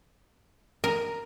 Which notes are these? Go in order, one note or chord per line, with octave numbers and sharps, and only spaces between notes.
A#4